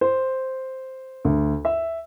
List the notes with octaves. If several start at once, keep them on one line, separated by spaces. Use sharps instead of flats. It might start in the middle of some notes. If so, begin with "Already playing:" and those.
C5
D2
E5